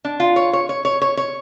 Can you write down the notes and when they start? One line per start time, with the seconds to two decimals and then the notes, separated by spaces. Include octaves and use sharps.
0.05 D4
0.20 F4
0.36 C#5
0.53 C#5
0.69 C#5
0.85 C#5
1.02 C#5
1.17 C#5